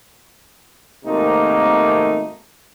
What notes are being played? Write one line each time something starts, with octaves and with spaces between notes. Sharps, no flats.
G#1 C3 A3 A#3 D#4